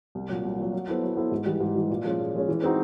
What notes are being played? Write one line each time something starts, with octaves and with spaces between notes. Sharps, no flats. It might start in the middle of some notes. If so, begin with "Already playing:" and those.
C2
A#2 F#3
C2
A#2 F#3
F#3
B3 E4 A4 C5
F#3
B3 E4 A4 C5
G#2
E3 G3
G#2
E3 G3
A#2
F3 G#3 C#4
A#2
F3 G#3 C#4
E3
G#3 C4 D#4 F#4